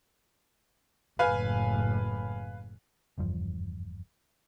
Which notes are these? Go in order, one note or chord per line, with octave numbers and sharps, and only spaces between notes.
F#1 A2 B4 F5 G#5
F#1 E2 G2 F3